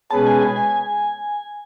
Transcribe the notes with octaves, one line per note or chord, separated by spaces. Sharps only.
B2 G#3 C#4 G#4 B4 A5
G#5
G#5
G#5